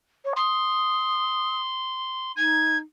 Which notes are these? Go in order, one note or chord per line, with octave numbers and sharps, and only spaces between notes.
C#5
C6 D#6
D#4 G#6